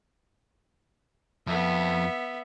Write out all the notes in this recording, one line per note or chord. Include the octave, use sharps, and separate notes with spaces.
F2 B3 E5